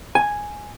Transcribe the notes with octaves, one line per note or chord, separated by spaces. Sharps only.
G#5